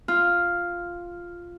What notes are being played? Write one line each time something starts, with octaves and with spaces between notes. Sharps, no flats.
F4